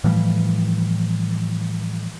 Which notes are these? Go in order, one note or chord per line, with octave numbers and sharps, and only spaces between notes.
A2 E3 F3 G3